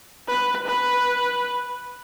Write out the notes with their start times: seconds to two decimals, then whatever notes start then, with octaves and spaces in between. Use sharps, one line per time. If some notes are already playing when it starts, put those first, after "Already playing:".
0.28 B4
0.67 B4